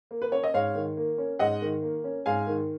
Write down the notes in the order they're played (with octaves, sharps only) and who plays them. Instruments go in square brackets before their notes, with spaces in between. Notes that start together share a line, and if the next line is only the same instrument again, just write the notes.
[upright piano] A#3
B4
C#4 C#5
D#5
G#2 C#5 F5
D#3
A#3
C#4
G#2 D#5 F#5
D#3
A#3
C#4
G#2 F5 G#5
D#3